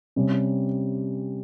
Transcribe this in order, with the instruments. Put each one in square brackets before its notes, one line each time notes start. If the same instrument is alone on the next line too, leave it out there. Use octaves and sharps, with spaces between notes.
[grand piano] C3 G3 C#4